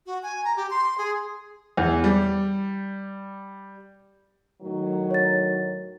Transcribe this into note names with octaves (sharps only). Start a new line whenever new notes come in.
F#4
G#5
A#5
G4
C6
G#4
E2
G3
A2 D#3 F#3
C#5 A6